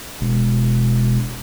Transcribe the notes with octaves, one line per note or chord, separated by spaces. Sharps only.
E1